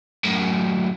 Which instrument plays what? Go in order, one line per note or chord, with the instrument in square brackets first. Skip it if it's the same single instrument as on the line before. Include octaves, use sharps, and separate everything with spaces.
[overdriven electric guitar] F#2 A2